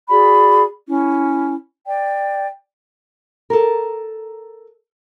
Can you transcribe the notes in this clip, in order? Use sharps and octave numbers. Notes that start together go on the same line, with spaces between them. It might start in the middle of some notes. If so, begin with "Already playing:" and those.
F#4 G#4 D5 B5
C#4 E4
D5 G5
A4 A#4